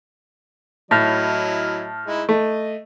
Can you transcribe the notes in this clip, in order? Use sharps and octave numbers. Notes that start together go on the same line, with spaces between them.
A2 F#3 E4 D#5 A5 F6
G#3 D#4 E4
A3 D#5